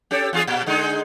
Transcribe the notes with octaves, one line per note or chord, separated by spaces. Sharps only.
C#4 G4 A4
E2 F4 G#4
A#2
D3 G#3 D#4